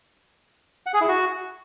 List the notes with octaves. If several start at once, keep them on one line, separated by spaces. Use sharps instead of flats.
F#5
G#4
E4
F#4